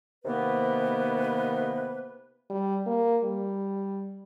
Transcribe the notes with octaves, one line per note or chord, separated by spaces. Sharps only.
C3 D#3 A#3 B3 B4
G3
A#3
G3